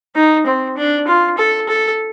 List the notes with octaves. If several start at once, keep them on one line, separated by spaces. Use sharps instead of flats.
D#4
C4
D4
F4
A4
A4